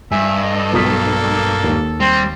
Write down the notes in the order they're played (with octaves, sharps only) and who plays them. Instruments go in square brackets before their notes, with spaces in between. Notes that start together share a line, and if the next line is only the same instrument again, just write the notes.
[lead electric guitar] G2 [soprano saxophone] E5 [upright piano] G#5
[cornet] A4 [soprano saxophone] D#5
[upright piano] B1 D#6 B6 [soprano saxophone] A#3
[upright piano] D#2
[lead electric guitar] G3 [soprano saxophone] C4